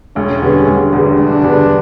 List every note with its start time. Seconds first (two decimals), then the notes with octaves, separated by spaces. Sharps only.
0.16 E1 C#4
0.41 E2 D3 G3 B3
0.67 E1
0.92 E2 D3 G3 B3
1.18 E1 D4
1.43 E2 D3 G3 B3